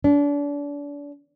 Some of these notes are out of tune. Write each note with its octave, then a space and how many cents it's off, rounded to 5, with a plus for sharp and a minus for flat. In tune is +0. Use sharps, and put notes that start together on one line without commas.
D4 -35